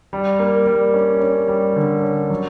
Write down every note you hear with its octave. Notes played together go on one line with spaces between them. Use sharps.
G3
A#3
G3
C#4
C#4
G3
D3
C#4
F#3